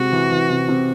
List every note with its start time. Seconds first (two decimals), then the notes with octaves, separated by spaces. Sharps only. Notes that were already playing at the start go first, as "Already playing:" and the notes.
Already playing: C3 G#3 F#4
0.12 E3
0.31 E3
0.50 C3
0.69 C3